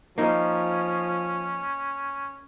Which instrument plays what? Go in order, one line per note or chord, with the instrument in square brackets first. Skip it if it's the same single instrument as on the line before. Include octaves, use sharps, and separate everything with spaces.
[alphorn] F3 [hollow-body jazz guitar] A#3 D#4 [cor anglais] C#4